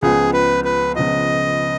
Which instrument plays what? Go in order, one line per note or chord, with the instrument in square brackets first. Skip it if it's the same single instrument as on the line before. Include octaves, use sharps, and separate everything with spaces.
[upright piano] C#2 C#3 F3 B3 F4 [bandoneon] G#4
[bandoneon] B4
B4
[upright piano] C#2 C#3 F3 B3 F4 [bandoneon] D#5